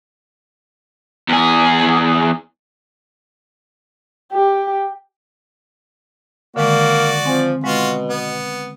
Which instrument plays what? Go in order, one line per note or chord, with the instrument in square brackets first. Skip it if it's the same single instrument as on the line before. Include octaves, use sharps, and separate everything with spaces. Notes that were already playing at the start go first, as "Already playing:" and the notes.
[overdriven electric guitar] E2 G#4
[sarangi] G4
[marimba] D3 D#3 G#3 [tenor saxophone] A#3 [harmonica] F#4 D5
[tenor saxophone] F3 [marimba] C4 G#5
[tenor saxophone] B2 [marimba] G#3 [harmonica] F4 F#4
[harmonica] B3